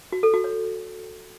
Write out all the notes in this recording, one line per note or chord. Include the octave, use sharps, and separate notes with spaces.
F#4
A4
F#4
C#5